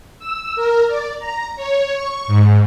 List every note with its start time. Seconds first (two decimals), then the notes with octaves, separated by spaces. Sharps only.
0.19 E6
0.56 A#4
0.87 D5
1.19 A#5
1.56 C#5
1.93 C#6
2.27 G#2